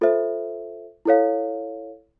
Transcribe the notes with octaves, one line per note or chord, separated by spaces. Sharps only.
F4 A4 C5 E5
E4 A4 C#5 F5